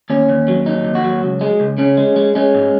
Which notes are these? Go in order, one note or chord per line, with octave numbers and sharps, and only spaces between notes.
D#2 C#4
D#2
F#3
D#2 D#4
D#2
F#4
F#3
C#2
G#3
C#2
C#3 C#4
G#3
G#3
G#3 C#4
G#2